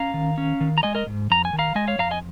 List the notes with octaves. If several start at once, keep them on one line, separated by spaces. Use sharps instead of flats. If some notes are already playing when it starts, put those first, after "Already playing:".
Already playing: C#4 F5 A#5
D#3
C#4
D#3
A#5
G#3 D#5 G#5
A#4 D#5
G#2
F2 A#5
G#5
D#3
F5 A#5
G#3 D#5 G#5
C#5 F5
F2 F5 A#5
D#5 G#5